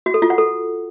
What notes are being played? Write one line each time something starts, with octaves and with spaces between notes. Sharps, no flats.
F#4
A4
F4
F#5
A4